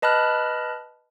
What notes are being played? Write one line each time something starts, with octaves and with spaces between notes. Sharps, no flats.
B4 D#5 A5 B5 F6 F#6